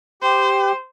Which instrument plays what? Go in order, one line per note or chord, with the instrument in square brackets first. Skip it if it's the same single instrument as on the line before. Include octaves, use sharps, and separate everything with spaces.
[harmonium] G4 [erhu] C5